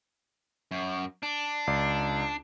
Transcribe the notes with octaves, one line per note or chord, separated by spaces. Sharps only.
F#2
D4
C#2 D5